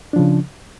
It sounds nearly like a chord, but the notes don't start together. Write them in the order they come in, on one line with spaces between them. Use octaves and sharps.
D4 F3 C#3